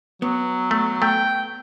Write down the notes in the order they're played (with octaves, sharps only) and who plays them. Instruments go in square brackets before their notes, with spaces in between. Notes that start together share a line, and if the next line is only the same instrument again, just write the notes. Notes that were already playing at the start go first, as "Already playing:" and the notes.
[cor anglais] F#3 [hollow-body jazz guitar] B3
[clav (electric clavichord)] A3
[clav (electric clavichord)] A3 [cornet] G5